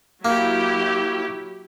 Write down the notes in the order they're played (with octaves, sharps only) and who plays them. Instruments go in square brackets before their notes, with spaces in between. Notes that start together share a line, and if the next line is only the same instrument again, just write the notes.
[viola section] F#3 E4 G4 [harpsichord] A#3